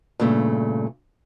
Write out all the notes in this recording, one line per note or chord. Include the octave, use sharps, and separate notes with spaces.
G2 A#2 C#3 A3